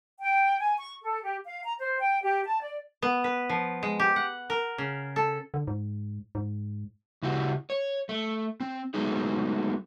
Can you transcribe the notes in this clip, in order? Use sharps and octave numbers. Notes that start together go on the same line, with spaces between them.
G5
G#5
C#6
A4
G4
F5
A#5
C5
G5
G4
A5
D5
B3
B4
F3
G#3
G4
F#5
A#4
C#3
A4
D3
G#2
G#2
C#3 E4 F#4 G4
C#5
A3
C4
F#3 G#3 A3 B3 D#4 G#4